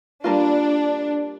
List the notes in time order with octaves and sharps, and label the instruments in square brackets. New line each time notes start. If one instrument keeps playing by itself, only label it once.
[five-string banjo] G3 A#3 F4 [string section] D4